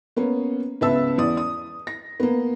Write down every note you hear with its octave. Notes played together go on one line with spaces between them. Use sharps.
A#3 B3 C#4
C#2 B3 B4 E5 A5 E6
E2 D5 D#6
D#6
A#6
A#3 B3